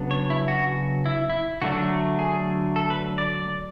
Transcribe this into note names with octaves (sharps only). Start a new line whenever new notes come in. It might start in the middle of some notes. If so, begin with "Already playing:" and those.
Already playing: C#3 F#3 B3 D4
C#5
E4
F#4
E4
E4
D3 F#3 A3 D4 F#4
G#4
A4
B4
D5